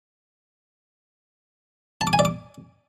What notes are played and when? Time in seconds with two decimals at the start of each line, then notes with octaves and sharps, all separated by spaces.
2.01 A5
2.07 D6
2.13 G#5
2.19 D5
2.25 D6